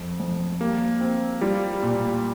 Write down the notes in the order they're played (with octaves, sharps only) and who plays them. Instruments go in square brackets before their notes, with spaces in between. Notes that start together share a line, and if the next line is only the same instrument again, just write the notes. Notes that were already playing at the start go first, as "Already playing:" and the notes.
Already playing: [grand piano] F2
F2
[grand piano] G3 [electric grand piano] A#3
[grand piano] C4
[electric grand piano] G3 [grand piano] F4
[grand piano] A#2